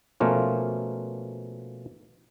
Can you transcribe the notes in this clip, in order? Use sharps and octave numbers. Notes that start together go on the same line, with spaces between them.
B2 F3 A3 A#3 C#4 F4